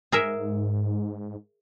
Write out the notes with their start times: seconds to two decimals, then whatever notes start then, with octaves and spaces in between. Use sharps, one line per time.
0.12 G#2 G#4 A#4 E5